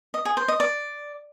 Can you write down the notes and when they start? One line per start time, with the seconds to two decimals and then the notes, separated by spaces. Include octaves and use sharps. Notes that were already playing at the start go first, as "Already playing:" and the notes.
0.14 D#5
0.25 G#4
0.37 C5
0.48 D#5
0.60 D5